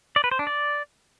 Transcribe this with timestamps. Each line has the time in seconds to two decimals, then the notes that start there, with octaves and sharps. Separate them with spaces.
0.16 D5
0.24 B4
0.31 C5
0.39 D4
0.47 D5